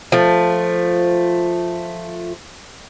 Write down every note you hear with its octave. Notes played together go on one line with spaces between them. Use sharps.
F3 A3